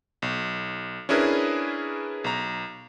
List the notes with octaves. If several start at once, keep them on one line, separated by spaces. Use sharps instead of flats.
B1
C#4 D4 E4 G#4 A#4 B4
B1 A#5